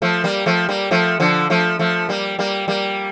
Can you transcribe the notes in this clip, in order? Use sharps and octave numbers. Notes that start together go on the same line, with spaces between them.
F3 A3
G3 A#3
F3 A3
G3 A#3
F3 A3
D3 F3
F3 A3
F3 A3
G3 A#3
G3 A#3
G3 A#3